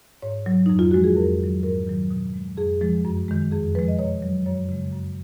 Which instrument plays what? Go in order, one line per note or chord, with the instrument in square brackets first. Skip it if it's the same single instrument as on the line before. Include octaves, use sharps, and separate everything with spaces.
[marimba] G#2 C#5
F#3
F2 D#4
F4
F3 G#3 F#4
G#4
F2 A#4
D#3 F#3
G#2 A#4
D#3 F#3
B2
G#3
F2 G#4
F3 G#3
F#2
D#3 G#3
F2 G#4
F3 G#3 B4
D#5
B2 C#5
F#3
F#2 C#5
C#3 G#3
F#2